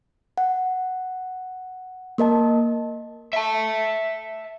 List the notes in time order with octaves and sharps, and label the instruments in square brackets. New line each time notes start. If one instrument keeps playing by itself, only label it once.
[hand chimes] F#5
A#3 A#4 D#5 A5
[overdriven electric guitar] E5 A5